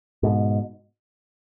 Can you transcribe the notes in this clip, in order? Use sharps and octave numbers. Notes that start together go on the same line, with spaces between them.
G#2 B2